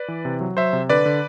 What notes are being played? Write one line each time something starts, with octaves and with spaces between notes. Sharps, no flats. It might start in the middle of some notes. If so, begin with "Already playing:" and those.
Already playing: B4 D5
E3
C3
F#3
F#3 C5 E5
C3
D3 B4 D5
D3